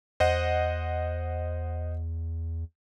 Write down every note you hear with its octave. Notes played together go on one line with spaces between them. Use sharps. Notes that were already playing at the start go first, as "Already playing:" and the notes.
E2 C5 D#5 F#5